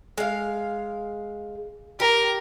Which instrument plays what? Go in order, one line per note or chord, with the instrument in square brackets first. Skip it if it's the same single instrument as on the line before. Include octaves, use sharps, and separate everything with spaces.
[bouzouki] G#3 F5
[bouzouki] G4 [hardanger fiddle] A#4